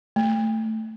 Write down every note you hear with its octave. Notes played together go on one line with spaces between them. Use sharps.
A3